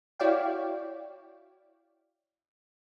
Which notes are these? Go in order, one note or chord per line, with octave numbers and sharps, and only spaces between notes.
E4 F#4 C#5 D5 F5 G5